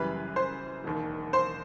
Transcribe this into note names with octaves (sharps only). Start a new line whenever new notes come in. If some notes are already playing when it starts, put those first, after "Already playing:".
Already playing: F#1 F#2 E3 G3 B4 B5
C5 C6
E1 D#2 D#3
C5 C6